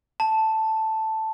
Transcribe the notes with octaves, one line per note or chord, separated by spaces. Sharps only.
A5